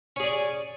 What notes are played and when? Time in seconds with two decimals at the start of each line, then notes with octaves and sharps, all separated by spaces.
0.16 C#4
0.20 G#4
0.23 D5